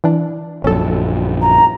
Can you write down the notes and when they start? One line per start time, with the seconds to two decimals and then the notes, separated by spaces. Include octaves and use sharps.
0.04 E3 D4
0.64 A#1 F#2 C#4 A4
1.41 A#5